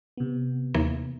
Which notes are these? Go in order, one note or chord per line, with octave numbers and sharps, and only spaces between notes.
C3 B3
D#2 E3 A#3